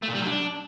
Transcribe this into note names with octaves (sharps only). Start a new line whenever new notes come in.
A3
A#2
G3
F#3
D4